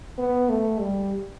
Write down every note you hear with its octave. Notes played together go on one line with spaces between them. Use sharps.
B3
A3
G3